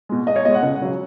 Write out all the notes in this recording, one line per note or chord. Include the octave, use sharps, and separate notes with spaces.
B2 G#3
E2 D#5
C#5
B2 G#3 D#5
F#5
C#2
C#3 F#3